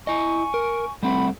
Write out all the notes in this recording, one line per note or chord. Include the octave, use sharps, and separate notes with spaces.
E4 D#5 G#5 C#6
A#4
G3 A3 C4 F#5 B5